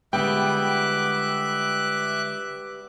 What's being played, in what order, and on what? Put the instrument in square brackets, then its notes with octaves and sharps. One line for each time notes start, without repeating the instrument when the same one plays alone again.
[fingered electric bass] D3 G#3 [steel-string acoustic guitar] G3 B3 [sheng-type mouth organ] E5 D6 F#6 [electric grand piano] G5